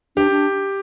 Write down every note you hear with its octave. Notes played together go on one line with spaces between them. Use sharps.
D4 G4
D4